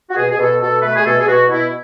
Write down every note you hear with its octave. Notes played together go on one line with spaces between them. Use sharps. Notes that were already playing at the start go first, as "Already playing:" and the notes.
F#4
B2 G#4
G#4
B2 A4
B2 A4
A3 B4
G#4
B2 A4
G#4
B2 F#4
B2 E4